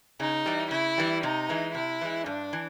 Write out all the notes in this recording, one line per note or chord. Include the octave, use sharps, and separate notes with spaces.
C#3 D#4
E3 G3
C#3 E4
E3 G3
C3 D#4
E3 G#3
C3 E4
E3 G#3
G2 D4
E3